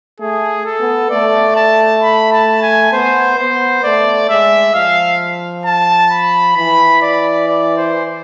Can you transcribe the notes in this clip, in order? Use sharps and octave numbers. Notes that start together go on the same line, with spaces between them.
A3 G#4
A4
B3
A3 D5
A5
B5
A5
G#5
B3 C5
B3 C5
A3 D5
G#3 E5
F3 F5
A5
B5
E3 B5
D5
D5
C5